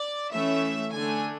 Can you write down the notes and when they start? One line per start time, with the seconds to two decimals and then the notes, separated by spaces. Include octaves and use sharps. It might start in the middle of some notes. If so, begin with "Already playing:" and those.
Already playing: D5
0.31 E3 A3 C#4 E5
0.92 D3 A3 D4 G#5